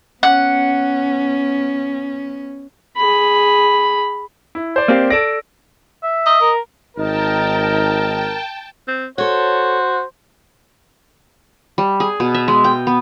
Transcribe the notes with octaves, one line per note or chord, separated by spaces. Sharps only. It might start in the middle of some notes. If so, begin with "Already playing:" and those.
B3 C#4 F#5
G#4 B5
E4
C5 D5
A#3 C4 G4
A4 D5 A#6 D7
E5
D#5
A#4
G#1 D#4 A#4 G5 A5
C4
F#4 A4 C5 C#5
G3
G#4
B2
E5
G#3
G5
B3